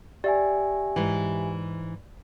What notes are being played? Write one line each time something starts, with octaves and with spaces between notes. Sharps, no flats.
G4 D5 E5 G#5
G#2 E3